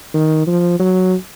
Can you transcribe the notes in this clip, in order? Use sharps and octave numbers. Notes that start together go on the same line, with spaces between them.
D#3
F3
F#3